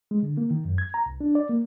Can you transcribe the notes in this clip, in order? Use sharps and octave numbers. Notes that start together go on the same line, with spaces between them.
G#3
D3
A#3
D#3
F#2
G#6
A#5
C2
D4
D5
A#3